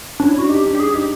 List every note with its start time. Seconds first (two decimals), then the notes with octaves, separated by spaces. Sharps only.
0.20 C#4 D4
0.29 E4
0.34 D4
0.39 F#4
0.49 D#4 G4
0.65 D4
0.75 G4
0.79 D#4 G#4
0.88 D4
0.94 D#4 G4